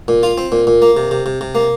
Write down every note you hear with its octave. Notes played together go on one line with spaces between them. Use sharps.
A#2
F4
C4
A#2
A#2
A#3
C3
C3
C3
C3
A#3